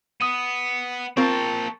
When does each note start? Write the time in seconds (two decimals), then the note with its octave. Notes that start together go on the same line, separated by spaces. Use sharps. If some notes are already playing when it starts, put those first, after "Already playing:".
0.21 B3 D#6 D#7
1.17 A#3 C4 F4 A#4 A5 C#6